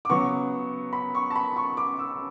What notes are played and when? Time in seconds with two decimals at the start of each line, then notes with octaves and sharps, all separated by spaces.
0.05 D6
0.09 C#3 F#3 B3 C#6
0.93 B5
1.15 C#6
1.30 A5
1.36 B5
1.56 C#6
1.77 D6
1.99 E6